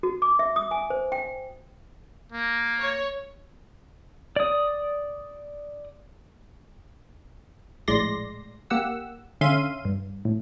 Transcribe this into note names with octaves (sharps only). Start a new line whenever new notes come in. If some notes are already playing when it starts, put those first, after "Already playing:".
F#4
D6
E5
D#6
G#5
C5
G5
A#3
C#5
D5 D#6
A#1 A2 G#3 D5 C6 A#6
A#3 G4 F#5 E6
D3 C#4 E5 F5 C6 D#7
G2
A2